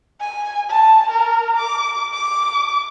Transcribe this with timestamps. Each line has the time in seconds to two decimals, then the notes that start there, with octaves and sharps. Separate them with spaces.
0.20 G#5
0.69 A5
1.10 A#4
1.56 D6
2.13 D6